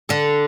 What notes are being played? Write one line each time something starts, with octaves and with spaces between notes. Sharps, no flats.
D3 A4